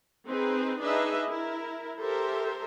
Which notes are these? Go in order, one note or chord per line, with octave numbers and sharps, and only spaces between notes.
C4 D#4 G#4 B4
D4 D#4 G#4 B4 D#5 E5
E4 A#4
G4 A4 A#4 C5 E5